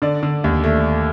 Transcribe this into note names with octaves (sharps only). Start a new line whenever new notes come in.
D3 D5
D3
D#2
A3